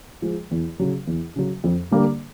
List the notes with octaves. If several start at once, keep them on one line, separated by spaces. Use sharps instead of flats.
F3 G#3
E2
C#3 F#3
E2
C#3 F#3
F2
D3 G3 A#3